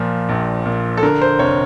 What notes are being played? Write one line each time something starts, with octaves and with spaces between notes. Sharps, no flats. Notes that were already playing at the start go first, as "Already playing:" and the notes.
Already playing: A#2 F3
A#1
A#2
A4
D3 A#4
C5
F1 C#5